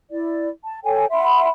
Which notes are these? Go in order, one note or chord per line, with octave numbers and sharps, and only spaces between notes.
E4 D5
A5
A4 C#5 G5 G#5
E5 F#5 B5 C6